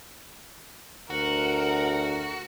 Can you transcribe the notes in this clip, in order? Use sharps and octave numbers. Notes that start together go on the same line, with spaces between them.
D2 F#4 A#4 F#5